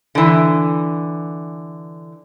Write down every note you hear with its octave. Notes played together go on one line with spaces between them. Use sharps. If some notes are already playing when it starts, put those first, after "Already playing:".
D3 E3